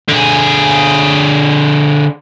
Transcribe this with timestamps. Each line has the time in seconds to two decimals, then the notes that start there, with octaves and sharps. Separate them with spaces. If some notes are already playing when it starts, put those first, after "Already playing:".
0.09 D3 G#4